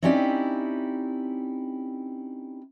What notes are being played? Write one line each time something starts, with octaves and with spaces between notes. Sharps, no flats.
C4 C#4 D#4 E4 G4 D5